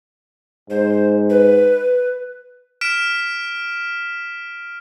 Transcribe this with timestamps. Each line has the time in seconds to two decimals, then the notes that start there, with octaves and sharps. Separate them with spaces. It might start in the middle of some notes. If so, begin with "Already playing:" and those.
0.70 G#2 C5
1.30 B4
2.81 F6 B6 D7 E7